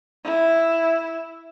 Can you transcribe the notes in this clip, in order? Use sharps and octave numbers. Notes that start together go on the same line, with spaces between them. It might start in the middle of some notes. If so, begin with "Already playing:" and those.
E4